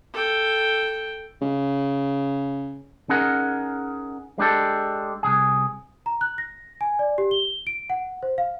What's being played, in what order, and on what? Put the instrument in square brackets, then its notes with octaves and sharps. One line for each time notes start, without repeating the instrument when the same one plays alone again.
[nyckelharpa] A4 G5
[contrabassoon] C#3
[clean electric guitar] C#4 D#4 G#4 A#4 F#5
G#3 D4 G4 A4
C2 F2 G#4
[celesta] A#5
F#6
A#6
G#5
D5
G4
G7
D7
F#5
C5
F5